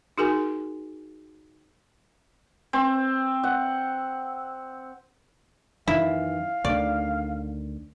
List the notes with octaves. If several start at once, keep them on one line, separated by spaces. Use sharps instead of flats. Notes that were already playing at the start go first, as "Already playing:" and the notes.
D#4 F#4 G#4 A#4 G#5
C4
F#5
F#2 D#3 E3 E4 F5
D2 D3 D#3 D5